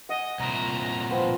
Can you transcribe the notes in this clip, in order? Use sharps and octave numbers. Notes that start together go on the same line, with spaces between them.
D#5 F#5 G#5
C2 A#2 A#5
F3 B3 C4